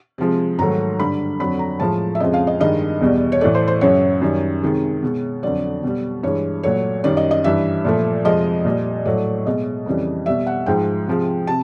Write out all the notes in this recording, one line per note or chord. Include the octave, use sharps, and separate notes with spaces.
C3 F3 G#3
G#2 D#3 F#3 A3 A#5
G2 D3 G3 B5
F2 D3 F#3 B5
A#5
A2 F3 G#3 A5
E5
F2 C#3 F3 G#3 D#5
F5
D#5
G2 D#3 G#3 D#5
E2 B2 G3
C#5
A2 E3 A3 D5
C5
C5
F#2 C#3 F#3 C#5
F#2 D#3 G3
C3 D#3 G#3
B2 G#3
F2 D3 F#3 D5
B2 G3
G2 E3 G#3 C#5
A#2 F#3 A3 C#5
F#2 D#3 G3 D5
D#5
D#5
G2 E3 G3 E5
A#2 F3 A3
F2 C3 F3 G#3 D#5
A#2 G3
A2 F#3 A3 D5
B2 G#3 D#5
F2 C#3 E3 G3
B2 G3 E5
F#5
G#2 F3 G#3 G5
C3 F3 G#3
C3 A5